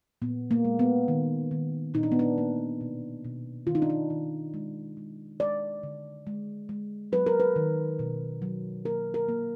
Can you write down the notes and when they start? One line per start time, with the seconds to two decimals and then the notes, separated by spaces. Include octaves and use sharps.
0.22 A#2 B3
0.51 A#3
0.65 G#3
0.79 B3
1.08 D#3
1.51 D#3
1.94 A#2 D#4
2.03 D4
2.12 B3
2.19 D4
2.38 A#3
2.81 B2
3.25 B2
3.67 D#3 F4
3.75 D#4
3.82 D4
3.90 D#4
4.10 D#3
4.54 G#3
4.97 G#3
5.40 G#3 D5
5.83 D3
6.27 G#3
6.69 G#3
7.12 F#3 B4
7.26 A#4
7.40 B4
7.56 D#3
7.99 B2
8.42 F#3
8.85 A#3 A#4
9.14 A#4
9.29 A#3